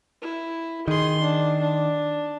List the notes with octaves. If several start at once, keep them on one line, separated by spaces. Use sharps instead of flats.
E4
D#3 G#4 C6
D4
D4